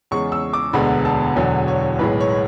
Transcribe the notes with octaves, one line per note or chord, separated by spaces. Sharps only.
E2 C#3 G#3 C#6
E6
D6
E1 D2 D3 G#3 B3 B5
A5
E1 E2 D3 F#3 G#5
C#5
B1 A2 G#3 B4
C#5